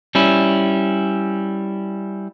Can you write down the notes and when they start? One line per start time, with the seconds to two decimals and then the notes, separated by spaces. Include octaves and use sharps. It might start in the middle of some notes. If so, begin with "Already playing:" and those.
0.15 G3 C#4 E4